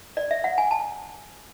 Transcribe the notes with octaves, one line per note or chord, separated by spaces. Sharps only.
D5
E5
F#5
G#5
A5